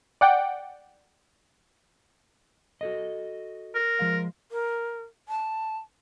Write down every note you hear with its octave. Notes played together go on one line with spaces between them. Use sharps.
D5 F#5 G5
F#4 A4 D#5
A#4
F3 G#3 F5
A#4
A5